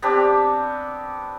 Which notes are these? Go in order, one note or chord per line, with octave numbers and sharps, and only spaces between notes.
B3 C4 D4 G4